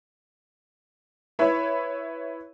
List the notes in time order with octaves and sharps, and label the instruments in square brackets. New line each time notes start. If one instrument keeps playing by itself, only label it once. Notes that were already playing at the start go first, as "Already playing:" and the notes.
[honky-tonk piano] E4 B4 C#5 E5 B5